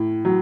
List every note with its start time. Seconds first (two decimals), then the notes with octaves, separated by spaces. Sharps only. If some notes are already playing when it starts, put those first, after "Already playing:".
Already playing: A2
0.25 F#3